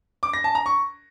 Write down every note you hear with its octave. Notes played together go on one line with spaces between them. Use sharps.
D6
A#6
A5
A#5
C#6